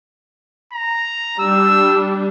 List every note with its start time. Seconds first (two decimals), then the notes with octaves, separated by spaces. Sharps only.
0.73 A#5
1.39 G3 D4 E6